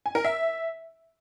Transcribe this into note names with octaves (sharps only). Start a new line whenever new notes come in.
G#5
A#4
E5